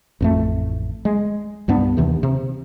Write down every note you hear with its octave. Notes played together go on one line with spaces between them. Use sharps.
A1 F2 A3
G#3
C2 G2 B3 D4
D#2 C3 E3
C3